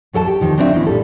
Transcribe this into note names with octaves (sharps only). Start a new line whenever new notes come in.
E2 F#3 A4 G5 A5
G4
E2 D#3 F3
F#3 C4 D4 F4 A#4 E5
G#2 D#3 E3 B3 E4
A#2 G3 A4